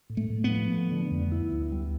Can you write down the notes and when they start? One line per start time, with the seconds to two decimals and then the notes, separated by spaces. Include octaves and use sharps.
0.10 A2
0.17 A3
0.30 A2
0.44 B3
0.50 F3
0.71 A3
0.91 D3
1.11 F2
1.32 E4
1.51 D2
1.72 G3